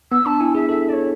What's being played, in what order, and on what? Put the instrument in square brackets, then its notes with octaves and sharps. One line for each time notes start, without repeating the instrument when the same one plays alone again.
[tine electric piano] B3 [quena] E6
[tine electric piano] D4 [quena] A5
[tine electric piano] E4 [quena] G#5
[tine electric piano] G#4 [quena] E5
[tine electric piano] A4 [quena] E5
[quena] D5
C#5